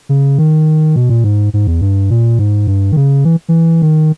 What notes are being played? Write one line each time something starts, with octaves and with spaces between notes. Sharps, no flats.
C#3
D#3
B2
A#2
G#2
G#2
E2
G2
A#2
G#2
G2
D#3
C#3
E3
E3
D#3